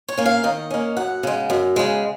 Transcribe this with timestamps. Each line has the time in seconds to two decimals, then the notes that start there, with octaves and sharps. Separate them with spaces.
0.09 C#5
0.18 A#3 C#4
0.26 F5
0.43 D#3 D#5
0.71 A#3 C#4
0.97 F#2 F#5
1.23 C#3 G#3
1.50 F#2
1.76 C#3 G#3